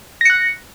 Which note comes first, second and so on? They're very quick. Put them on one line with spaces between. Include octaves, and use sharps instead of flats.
A#6 C#7 F#6